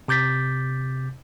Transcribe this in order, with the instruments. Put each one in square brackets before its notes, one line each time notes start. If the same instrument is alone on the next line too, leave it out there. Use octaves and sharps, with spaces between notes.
[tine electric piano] C3 D6 G6 A6 B6